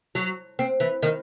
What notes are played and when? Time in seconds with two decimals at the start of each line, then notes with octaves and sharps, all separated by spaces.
0.15 F#3
0.59 C4
0.80 E3
1.03 D#3